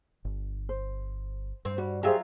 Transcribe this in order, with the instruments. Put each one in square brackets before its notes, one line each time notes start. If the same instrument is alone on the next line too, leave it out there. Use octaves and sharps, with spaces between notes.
[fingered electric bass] G1
[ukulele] C5
[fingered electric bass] G2 [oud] C4 C5
[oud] G3 [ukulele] F#4
[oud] F#3 F4 E5 [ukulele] G4 G#4 C5